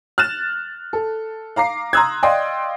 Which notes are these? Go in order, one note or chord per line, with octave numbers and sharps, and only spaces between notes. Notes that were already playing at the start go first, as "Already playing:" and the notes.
F6 F#6 A6 E7
A4
F5 A#5 D6 C7
A#5 C6 D#6 E6 F#6 G#6
D5 D#5 F5 G5 C6 D#6